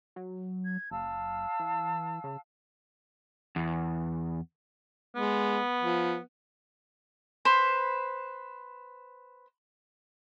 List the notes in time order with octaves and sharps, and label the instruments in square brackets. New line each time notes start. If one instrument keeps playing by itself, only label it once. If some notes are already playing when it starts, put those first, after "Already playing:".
[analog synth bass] F#3
[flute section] G#6
[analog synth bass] F#1 [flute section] F5 A5 E6
[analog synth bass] E3
C#3
[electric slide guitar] E2
[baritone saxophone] G#3 [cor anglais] B3
[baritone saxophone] F3
[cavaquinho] B4 C5 B5